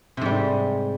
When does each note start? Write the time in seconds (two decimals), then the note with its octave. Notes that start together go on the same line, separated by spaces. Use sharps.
0.17 C3
0.21 G#2
0.25 G3